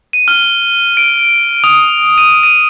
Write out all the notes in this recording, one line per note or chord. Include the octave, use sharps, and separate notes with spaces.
D#7
F6
D7
D#6
D#7
D#7